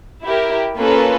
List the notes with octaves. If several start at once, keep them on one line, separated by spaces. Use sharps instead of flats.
E4 G4 A#4
A#3 C#4 F4 A4 B4